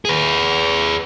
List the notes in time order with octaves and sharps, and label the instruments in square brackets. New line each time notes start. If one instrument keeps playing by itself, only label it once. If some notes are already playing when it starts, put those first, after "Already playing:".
[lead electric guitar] G#4 B4